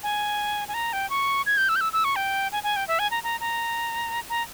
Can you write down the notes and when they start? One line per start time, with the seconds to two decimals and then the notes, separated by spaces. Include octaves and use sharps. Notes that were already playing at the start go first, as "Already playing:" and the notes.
0.03 G#5
0.68 G#5
0.74 A#5
0.93 G5
1.10 C#6
1.46 G#6
1.57 G6
1.69 E6
1.76 G6
1.81 E6
1.93 E6
2.04 C#6
2.16 G5
2.52 G#5
2.63 G#5
2.76 G5
2.88 E5
2.99 G#5
3.11 A#5
3.24 A#5
3.40 A#5
4.29 A#5